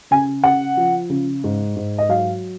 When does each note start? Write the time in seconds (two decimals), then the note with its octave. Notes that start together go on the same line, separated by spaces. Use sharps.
0.11 C#3 G#5
0.44 C#3 F#5
0.77 F3
1.10 C#3
1.44 G#2
1.76 G#2
1.98 D#5
2.09 F#3 F5